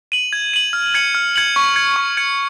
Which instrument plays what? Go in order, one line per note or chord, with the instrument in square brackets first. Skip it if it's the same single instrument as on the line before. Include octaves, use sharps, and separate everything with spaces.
[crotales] D#7 F#7
G#6
D#7 F#7
F6
G#6 C#7 F#7
F6
G#6 C#7 F#7
C#6
G#6 C#7
C#6
G#6 C#7